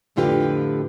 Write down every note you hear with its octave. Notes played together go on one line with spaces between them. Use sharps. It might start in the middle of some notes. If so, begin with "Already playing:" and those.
F2 A2 D3 F4 G4 B4